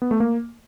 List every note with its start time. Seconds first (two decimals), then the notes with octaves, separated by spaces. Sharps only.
0.02 B3
0.11 A3
0.20 A#3